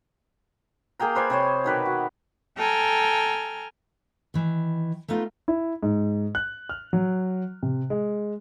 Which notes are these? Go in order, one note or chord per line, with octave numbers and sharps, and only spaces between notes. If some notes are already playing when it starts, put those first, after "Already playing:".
A#3 G#4 G5 A#5
B4 C5 D5 G#5
C3 C5 C#5
B2 D#3 B4 D6
F#4
A4 G5 G#5 A#5 F6
D#3 E3
A3 B3 D#4 F4
E4
G#2
F#6
F6
F#3
C3
G#3